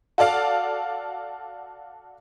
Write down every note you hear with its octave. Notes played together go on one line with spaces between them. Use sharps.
F#4 A4 D5 F5